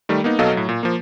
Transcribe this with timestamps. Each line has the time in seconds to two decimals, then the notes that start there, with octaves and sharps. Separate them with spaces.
0.09 D#3 G3 A3
0.24 A#3 B3 D#4
0.39 B2 F#3 A4 D#5 F5
0.53 A2 F#3
0.69 A#2
0.83 F3 A#3